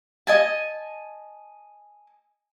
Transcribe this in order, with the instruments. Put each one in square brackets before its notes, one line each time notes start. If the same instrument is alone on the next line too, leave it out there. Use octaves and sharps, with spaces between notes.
[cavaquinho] D#5 G#5 A5